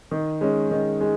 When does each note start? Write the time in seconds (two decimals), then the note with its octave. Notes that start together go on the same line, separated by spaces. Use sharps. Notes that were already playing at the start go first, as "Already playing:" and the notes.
0.11 D#3
0.41 G#3 C#4
0.71 D#3
1.01 G#3